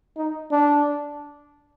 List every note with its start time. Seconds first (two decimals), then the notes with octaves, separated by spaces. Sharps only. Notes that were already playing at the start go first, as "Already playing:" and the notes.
0.17 D#4
0.51 D4